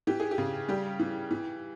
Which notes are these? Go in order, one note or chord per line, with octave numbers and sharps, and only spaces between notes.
E3 G4
G#4
G4
C#3
G3 G4
E3
E3